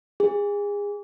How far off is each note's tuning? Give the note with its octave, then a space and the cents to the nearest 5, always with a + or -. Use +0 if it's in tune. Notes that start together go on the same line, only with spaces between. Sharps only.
G#4 -30